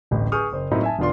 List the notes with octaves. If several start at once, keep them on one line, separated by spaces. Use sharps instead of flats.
D1 A1 A2
G#4 B4 C#6 D#6 F6 G6
F#1 C5
A2 F#3 A#3 C4 D#4 E4
E5 G#5 A5
E1 D3 B3 F4 D5 C6